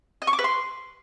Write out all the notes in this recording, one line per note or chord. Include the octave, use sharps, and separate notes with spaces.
D#5
C#6
D6
B4
C6